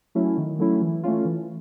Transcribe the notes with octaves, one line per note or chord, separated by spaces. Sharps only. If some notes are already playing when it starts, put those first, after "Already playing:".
F#3 A3 C#4 E4
D#3
F#3 A3 C#4 E4
E3
A3 C#4 F4
E3